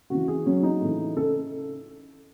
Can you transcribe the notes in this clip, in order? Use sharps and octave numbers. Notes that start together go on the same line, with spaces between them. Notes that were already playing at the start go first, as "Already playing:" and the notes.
C#3 E3 F#4
G#4
C#3 F#3 C#4
D#4
A2 E3
C#3 A4